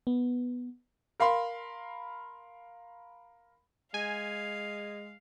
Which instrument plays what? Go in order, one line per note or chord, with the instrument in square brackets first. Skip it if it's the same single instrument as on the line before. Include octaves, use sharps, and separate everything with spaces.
[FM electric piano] B3
[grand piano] A#4 F5 B5 C6
[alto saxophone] G#3 [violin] F5 [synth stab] G#5